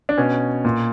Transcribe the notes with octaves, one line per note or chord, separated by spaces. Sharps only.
D4
B2 C#4
A#2